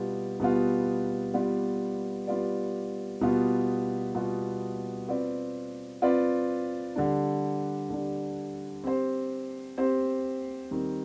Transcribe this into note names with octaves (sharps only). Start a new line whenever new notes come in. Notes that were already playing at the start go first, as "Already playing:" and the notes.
Already playing: B2 G3 B3 F4
B2 G3 B3 F4
G3 B3 F4 B4 D5
G3 B3 F4 B4 D5
B2 G3 B3 F4
B2 G3 B3 F4
C4 F4 B4 D5
C4 F4 B4 D5
D3 G3 D4
D3 G3 D4
C4 G4 C5
C4 G4 C5
D#3 G3 C4 D#4